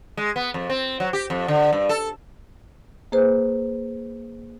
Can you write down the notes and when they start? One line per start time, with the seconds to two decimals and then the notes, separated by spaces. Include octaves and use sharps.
0.17 G#3
0.36 B3
0.54 F2
0.70 C4
1.00 F#3
1.13 G4
1.30 F2
1.48 D3
1.73 G2
1.89 A4
3.12 A#3 G#4 B4 C5